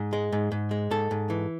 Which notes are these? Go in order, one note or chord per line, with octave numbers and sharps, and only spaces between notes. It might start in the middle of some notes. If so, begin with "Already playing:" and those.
Already playing: G#2
G#3
G#2
G#2
G#3
G#2 A4
G#2
E3